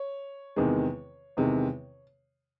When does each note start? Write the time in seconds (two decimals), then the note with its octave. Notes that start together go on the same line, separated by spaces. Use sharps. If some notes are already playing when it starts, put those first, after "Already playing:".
Already playing: C#5
0.56 E2 C3 D#3 G#3
1.37 E2 C3 D#3 G#3